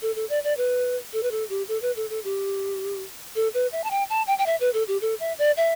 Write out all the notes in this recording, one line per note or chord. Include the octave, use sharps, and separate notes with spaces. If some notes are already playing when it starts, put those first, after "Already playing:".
A4
A4
D5
D5
B4
A4
B4
A4
G4
A4
B4
A4
A4
G4
A4
B4
E5
A5
G5
A5
G5
G5
E5
B4
A4
G4
A4
E5
D5
E5